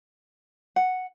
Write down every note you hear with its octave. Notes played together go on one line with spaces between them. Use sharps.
F#5